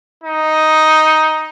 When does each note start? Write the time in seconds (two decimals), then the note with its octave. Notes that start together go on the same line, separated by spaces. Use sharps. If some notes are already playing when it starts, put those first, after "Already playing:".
0.24 D#4